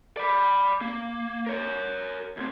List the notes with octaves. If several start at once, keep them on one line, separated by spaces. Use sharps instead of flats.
D5 B5
A#3
A#4 C#5
D2 C4